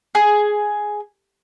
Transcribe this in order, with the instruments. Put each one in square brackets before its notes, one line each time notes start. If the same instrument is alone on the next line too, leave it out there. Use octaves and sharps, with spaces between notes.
[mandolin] G#4